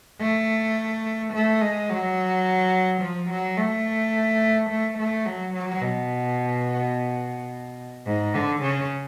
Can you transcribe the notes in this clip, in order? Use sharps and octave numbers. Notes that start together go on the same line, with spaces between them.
A3
A3
G#3
F#3
F3
F#3
A3
A3
A3
F#3
F#3
B2
G#2
D3
C#3